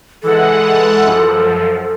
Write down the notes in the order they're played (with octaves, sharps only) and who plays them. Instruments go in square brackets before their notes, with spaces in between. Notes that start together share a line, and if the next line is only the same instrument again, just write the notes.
[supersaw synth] E3 G#3 F#5 [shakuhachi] A4
[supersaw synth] F#2 F3